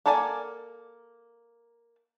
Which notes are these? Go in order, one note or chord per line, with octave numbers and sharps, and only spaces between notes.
A#3 A4 A#4 D5 G#5